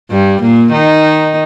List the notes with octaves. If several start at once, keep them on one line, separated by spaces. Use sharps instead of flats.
G2 G3
A#2 A#3
D#3 D#4